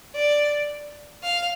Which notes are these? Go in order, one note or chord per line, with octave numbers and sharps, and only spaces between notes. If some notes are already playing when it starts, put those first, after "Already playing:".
D5
F5